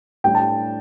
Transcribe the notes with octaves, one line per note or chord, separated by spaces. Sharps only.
A2 G3 D4 G5
A5